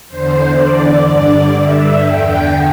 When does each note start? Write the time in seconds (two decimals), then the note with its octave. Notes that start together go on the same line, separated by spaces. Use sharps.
0.08 E2 D3 C5
0.58 D5
1.08 G2 D3 D5
1.57 E5
2.07 E2 D3 G5